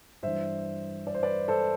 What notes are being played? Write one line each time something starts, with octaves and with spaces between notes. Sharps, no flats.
G2 E3 C5 E5
D5
C5
B4 D5
A4 C5